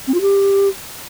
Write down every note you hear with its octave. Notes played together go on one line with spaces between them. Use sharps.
C4
F4
G4